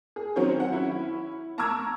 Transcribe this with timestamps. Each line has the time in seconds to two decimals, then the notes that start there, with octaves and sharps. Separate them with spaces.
0.16 G#4
0.36 D#3 F#3 C4 C#4 C5 C#5
0.60 F#5
0.72 C#4 E4
1.58 A5 A#5 C#6 D6 E6 G#6